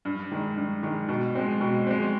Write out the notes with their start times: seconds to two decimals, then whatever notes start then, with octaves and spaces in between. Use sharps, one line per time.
0.05 G2
0.32 D#3 G#3
0.57 G2
0.83 D#3 G#3
1.09 B2
1.35 G#3 C4
1.61 B2
1.87 G#3 C4